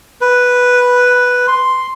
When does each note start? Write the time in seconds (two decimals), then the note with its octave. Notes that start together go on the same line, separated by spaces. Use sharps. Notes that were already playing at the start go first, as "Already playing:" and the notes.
0.21 B4
1.48 C6